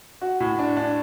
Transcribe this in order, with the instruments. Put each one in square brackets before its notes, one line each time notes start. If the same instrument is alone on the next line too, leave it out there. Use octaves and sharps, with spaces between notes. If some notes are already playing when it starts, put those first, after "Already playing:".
[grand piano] F#4
A2
D4
D4